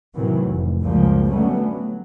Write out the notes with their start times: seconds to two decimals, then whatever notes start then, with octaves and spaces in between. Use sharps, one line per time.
0.14 F#2 A2 C3 D#3 E3 F#3
0.43 F1
0.81 C#2 F#2 C#3 F3 G3 A#3
1.29 D3 F#3 G3 A3 B3 C#4
1.69 F#3